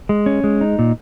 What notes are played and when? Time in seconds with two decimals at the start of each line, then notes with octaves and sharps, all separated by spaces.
0.09 G#3
0.26 C#4
0.44 G#3
0.61 D#4
0.79 A#2